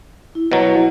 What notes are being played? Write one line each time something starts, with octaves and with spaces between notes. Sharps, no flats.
E4
B2 F#3